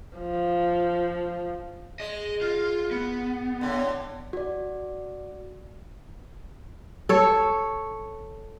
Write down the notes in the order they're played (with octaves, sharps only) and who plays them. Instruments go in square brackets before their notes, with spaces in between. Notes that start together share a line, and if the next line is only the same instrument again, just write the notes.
[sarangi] F3
[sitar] G#3 [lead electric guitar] D#5
[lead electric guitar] F4
B3
[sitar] A2 D3
[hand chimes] F#4 D5
[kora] A4 C#5